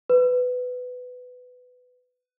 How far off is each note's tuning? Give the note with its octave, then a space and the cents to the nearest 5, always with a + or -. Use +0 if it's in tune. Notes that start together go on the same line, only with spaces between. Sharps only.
B4 +15